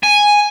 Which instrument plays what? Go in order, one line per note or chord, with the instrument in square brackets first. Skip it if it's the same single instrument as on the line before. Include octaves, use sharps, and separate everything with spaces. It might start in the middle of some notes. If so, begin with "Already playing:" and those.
[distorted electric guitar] G#5